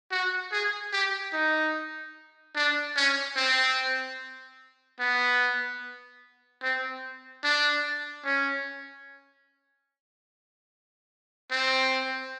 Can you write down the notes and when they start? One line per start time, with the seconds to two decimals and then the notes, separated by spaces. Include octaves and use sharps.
0.11 F#4
0.52 G#4
0.93 G4
1.33 D#4
2.56 D4
2.96 C#4
3.36 C4
5.00 B3
6.63 C4
7.44 D4
8.25 C#4
11.51 C4